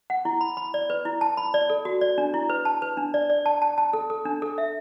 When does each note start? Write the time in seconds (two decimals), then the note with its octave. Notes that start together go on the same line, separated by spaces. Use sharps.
0.10 F#5
0.25 E4
0.41 B5
0.57 B5
0.74 D5
0.90 B4
1.05 E4
1.21 A5
1.37 B5
1.54 D5
1.70 A4
1.85 F#4
2.01 D5
2.18 D4
2.34 E4
2.50 B4
2.65 A5
2.82 B4
2.97 D4
3.14 D5
3.30 D5
3.46 A5
3.62 A5
3.78 A5
3.93 A4
4.10 A4
4.25 D4
4.42 A4
4.58 E5